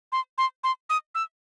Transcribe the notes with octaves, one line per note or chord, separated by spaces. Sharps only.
C6
C6
C6
D#6
E6